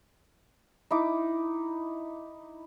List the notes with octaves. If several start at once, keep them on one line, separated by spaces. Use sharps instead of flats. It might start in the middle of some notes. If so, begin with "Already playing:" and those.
D#4 E4 D6